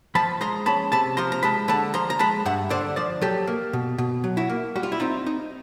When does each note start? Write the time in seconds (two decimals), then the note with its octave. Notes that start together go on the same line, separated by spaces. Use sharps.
0.15 F3 A5 B5
0.41 G#3 A#5 C6
0.66 C#4 A5 B5
0.92 C3 A5 B5
1.17 F3 A#5 C6
1.32 A#5
1.43 G#3 A5 B5
1.68 D3 A5 B5
1.94 F3 A#5 C6
2.10 A#5
2.19 G#3 A5 B5
2.45 G2 E5 F#5
2.70 D3 C5 D5
2.96 F3 C5 D5
3.21 F#3 G4 A4
3.47 A#3
3.73 B2
3.98 B2
4.24 F#3
4.37 E4 F#4
4.49 A#3
4.76 G3 F#4
4.83 F4
4.92 E4
5.00 C4 D#4 F4
5.26 D#4